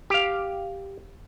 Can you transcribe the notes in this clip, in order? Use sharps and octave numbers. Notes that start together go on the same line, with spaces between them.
G4 F5